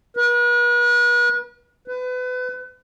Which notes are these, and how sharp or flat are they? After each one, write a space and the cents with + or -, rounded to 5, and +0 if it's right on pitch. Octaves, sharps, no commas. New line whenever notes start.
B4 -40
B4 +30